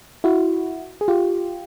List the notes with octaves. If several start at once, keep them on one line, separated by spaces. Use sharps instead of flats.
E4 F#4
G#4
F4 G4